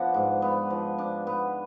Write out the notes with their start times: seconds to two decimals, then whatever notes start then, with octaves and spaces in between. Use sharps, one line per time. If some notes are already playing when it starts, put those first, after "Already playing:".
Already playing: F3 B3 D4 D5 F#5
0.14 G#2
0.42 B3
0.70 F3
0.98 D4
1.27 B3